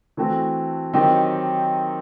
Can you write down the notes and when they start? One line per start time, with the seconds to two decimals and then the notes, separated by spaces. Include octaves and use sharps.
0.17 E3 A3 C4 F#4
0.93 D#3 F#3 C4 D#4 G4